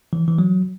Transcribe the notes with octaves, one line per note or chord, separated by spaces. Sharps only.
E3
E3
F#3